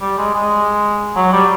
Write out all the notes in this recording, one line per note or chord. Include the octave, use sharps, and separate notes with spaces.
G3
G#3
G#3
F#3
G3